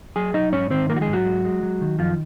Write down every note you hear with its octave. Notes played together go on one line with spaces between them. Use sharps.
F#3 G#4 G#5
F#3 D#4 D#5
G#2 C#4 C#5
D#3 C4 C5
F3 A#3 A#4
F#4
G#3 G#4
G#2
F#3 F#4
G#3
G#3
F#3
D#3
F#2 F3 F4